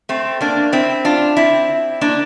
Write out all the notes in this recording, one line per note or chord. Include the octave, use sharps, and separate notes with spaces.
A3 C4
A#3 D4
C4 E4
D4 F4
C4 E4
A#3 D4